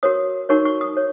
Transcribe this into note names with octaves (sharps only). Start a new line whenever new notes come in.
F#4 A#4 C#5 D#6
D#4 F#4 A#4 C#5 C#6
C#6
D#6
C#5